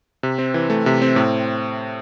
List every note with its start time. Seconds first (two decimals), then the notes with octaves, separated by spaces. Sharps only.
0.23 C3
0.38 C4
0.54 E3
0.70 A3
0.86 C3
1.02 C4
1.16 A2